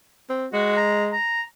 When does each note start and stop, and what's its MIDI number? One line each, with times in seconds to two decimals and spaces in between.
0.29 0.47 60
0.53 1.15 56
0.53 0.73 66
0.77 1.04 82
1.13 1.41 82